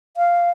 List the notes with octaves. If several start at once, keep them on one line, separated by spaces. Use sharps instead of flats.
F5